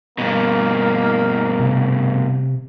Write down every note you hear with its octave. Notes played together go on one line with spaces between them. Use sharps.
G2 B2 A#3
C3